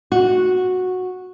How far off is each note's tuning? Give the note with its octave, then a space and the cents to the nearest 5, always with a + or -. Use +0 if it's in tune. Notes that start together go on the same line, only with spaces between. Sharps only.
F#4 -10